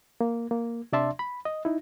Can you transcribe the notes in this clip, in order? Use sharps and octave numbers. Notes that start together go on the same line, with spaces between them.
A#3
A#3
C3 D4 D5 E5 A5 C6
B5
D#5
D#4 E4